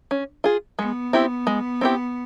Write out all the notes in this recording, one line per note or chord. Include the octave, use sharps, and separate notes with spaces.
C#4
F4 G#4
G#3 B3
C4 E4 G4
G#3
C4 E4 G4